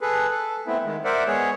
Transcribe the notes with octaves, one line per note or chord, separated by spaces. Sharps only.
G#4 A4 B4
A4
A3 B3 C4 E4
D#3 G#3
A#4 C5 D5 E5 F#5
G#3 B3 G#4 C#5